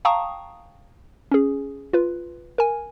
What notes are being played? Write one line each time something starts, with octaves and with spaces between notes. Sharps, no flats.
F5 G5 A5 A#5 C#6 D#6
C#4 G#4
F4 B4
A#4 G#5